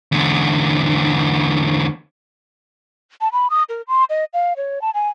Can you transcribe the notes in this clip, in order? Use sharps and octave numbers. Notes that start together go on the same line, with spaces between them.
E2 D3
A5
B5
D#6
A#4
C6
D#5
F5
C#5
A5
G#5